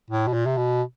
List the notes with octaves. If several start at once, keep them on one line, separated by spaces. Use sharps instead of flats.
A2
B2
A#2
C3
B2